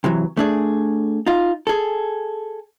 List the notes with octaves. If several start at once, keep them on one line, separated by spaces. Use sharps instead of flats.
C3 E3 F#3
A3 D4 G#4
D#4 F4
G#4 A4